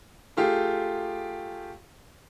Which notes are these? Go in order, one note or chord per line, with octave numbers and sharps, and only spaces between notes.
A3 F4 G4 G#4